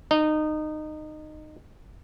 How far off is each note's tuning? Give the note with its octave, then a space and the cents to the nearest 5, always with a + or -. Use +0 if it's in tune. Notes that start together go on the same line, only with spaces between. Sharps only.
D#4 -20